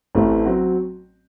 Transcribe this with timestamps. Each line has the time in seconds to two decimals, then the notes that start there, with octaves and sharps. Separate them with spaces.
0.15 A1 A2 E3 A3 C4
0.45 F#3 C4 F#4